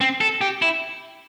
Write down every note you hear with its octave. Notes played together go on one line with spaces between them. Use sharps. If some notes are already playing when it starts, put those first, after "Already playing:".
C4
A4
G4
E4